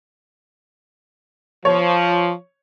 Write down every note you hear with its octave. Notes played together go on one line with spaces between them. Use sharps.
F3 C#5